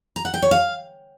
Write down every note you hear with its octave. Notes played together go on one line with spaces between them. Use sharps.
A#5
F#5
G5
C#5
F5